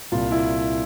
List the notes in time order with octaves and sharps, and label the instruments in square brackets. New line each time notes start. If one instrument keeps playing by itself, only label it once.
[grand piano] C2 A#2 F4
E4